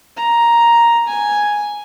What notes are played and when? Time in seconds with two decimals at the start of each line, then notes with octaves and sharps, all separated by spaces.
0.17 A#5
1.08 G#5